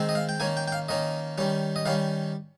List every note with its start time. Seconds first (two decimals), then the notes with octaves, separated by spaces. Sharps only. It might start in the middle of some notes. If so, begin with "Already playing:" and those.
Already playing: D#3 G#3 C4
0.09 D#5
0.15 F5
0.29 G5
0.40 D#3 A#3 C#4 G#5
0.57 G5
0.68 G5
0.72 F5
0.89 D#3 A#3 C#4 D#5
1.38 D#3 G3 C#4
1.76 D#5
1.86 D#3 G3 C#4 F5